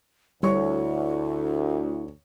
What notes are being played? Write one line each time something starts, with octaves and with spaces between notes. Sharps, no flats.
D2 G3 E4 C#5 C#6